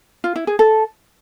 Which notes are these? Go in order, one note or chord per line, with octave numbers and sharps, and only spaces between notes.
F4
E4
G#4
A4